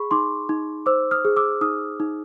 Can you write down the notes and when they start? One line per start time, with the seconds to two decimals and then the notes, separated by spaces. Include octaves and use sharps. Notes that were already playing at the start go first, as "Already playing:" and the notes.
Already playing: G#4 B5 C#6
0.11 D#4 C6 D6
0.49 D#4
0.86 C5 D6 E6
1.11 D#6 F6
1.25 G#4
1.36 D6 E6
1.61 D#4 D#6 F6
2.00 D#4